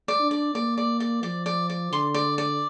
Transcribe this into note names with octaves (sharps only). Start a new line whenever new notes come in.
D5
D4
D5
A#3 D5
D5
D5
F3 D5
D5
D5
D3 C6
D5
D5